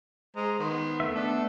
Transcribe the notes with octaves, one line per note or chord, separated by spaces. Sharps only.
G#3 C5 A#5
D#3 B3 C6
A3 B3 E5
D4 A4